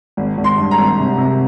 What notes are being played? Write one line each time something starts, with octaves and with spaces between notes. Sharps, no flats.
G#1
G#1
C6
G2
A#5
G#1
C3
C3